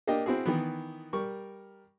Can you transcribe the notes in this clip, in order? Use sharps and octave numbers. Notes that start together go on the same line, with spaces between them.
A#3 D4 G4 D#5 G5
C4 E4 F#4 G#4
D#3 E3 B3
G3 A#4 C#6